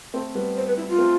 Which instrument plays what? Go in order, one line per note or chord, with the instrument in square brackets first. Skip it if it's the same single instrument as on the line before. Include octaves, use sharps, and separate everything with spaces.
[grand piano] A3 C4
G3 B3
[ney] C5
B4
E4
F4
[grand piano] A3 C4